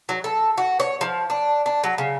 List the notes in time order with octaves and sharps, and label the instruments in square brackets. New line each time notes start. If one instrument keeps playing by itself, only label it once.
[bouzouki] F#3
A4
F#4
C#5
F3
D4
D4
F#3
C#3